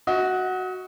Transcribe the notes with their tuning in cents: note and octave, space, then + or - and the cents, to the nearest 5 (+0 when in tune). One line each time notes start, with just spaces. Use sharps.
F#4 +0 D#5 +40